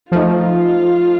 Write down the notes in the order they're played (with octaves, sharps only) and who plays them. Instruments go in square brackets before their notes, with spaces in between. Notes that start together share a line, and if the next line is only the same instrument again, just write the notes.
[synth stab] F3 A3 D#4 [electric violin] F4